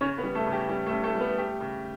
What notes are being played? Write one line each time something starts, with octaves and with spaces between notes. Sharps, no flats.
C#3 C#4 C#5
B3 B4
G3
A3 A4
C#3
G4
G3 G4
A3 A4
C#3
A3 A4
G3
B3 B4
A3 G4
C#3